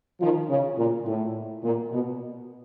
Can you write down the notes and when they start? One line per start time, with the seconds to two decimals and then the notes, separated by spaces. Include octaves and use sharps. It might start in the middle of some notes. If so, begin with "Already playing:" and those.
0.21 D#3 F3
0.49 C#3
0.77 A#2
1.06 A2
1.64 A#2
1.92 B2